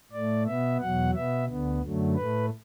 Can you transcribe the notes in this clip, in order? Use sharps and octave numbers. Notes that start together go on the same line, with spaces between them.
A2 A3 D5
B2 B3 E5
E2 B2 F#3 F#5
B2 B3 E5
D2 D3 B3
F#2 D3 F#3 A3
A2 A3 B4